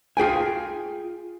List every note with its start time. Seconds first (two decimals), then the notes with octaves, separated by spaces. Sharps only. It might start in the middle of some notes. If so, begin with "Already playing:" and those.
0.17 F4 G#4 G5 G#5